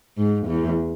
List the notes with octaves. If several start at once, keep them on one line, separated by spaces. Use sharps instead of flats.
G#2
E2